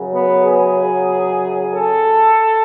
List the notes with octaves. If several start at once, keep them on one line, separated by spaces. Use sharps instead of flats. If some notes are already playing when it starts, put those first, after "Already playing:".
Already playing: F#2 C#3 F#3
B3
G#4
A4